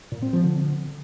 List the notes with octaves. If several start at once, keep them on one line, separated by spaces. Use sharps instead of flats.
A#2
C4
F3
D3